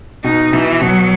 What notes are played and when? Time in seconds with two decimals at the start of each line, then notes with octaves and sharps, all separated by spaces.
0.24 B2 D#4
0.52 B2 E3
0.81 B2 F#3